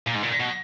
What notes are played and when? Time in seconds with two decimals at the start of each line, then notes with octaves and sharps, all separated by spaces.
0.07 A#2
0.14 G#2
0.23 A#2
0.40 B2